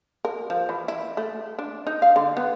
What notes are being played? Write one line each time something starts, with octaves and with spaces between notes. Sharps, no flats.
A#4
F3
E3
E4
A3
D4
D#4
F5
D3
B3